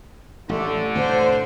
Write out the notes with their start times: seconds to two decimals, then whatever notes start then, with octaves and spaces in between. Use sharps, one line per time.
0.49 A1 D3 A3
0.95 D2 A2 C3 C5